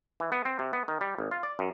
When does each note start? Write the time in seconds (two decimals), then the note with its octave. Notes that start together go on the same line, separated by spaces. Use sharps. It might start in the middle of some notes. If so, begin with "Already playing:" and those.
0.20 E3
0.32 B3
0.45 C4
0.59 C3
0.73 B3
0.88 D#3
1.01 G3
1.18 G#1
1.31 F4
1.43 D5
1.59 F#2